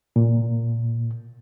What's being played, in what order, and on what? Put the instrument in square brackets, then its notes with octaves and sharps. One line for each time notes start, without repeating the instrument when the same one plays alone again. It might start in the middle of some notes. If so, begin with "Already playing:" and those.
[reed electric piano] A#2